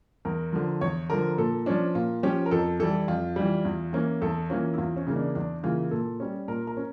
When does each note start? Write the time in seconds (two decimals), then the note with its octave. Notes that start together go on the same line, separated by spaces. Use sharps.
0.25 E2 A#4
0.53 D3 F3
0.81 E2 C#5
1.10 D3 F3 A#4
1.38 A#2 A4
1.66 F3 C#4 D4
1.95 A#2 F4
2.23 F3 C#4 G4
2.46 A#4
2.51 F2 A4
2.80 E3 G3 A4
3.08 F2 F4
3.36 E3 G3
3.65 E2
3.93 E3 A#3 C#4
4.22 E2 A4
4.50 E3 A#3 C#4 F4
4.74 E4
4.78 E2 F4
4.97 C#4
5.07 C#3 E3 A#3
5.16 D4
5.35 E2 D4
5.63 C#3 E3 A#3 F4
5.91 A#2 A4
6.20 G3 C#4
6.48 A#2 A#4
6.67 A#4
6.77 C#4